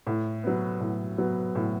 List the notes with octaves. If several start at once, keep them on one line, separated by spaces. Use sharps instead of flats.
A2
F#3 B3
A2
F#3 B3
A2